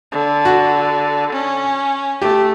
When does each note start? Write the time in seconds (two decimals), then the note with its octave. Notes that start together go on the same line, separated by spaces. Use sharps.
0.12 D3
0.45 F#4
1.32 C#4
2.22 A3 G4